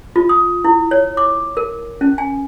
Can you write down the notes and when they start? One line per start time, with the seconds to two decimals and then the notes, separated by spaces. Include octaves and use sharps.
0.16 F4
0.29 D#6
0.65 E4
0.91 C#5
1.17 D6
1.57 A#4
2.01 C#4
2.18 G#5